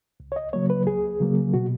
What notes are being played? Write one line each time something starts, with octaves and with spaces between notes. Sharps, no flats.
C#2
C#5
D#5
C#3 F#3 A#3 C#5
B4
C#2 G#4
C#3 F#3 A#3
B2 F#4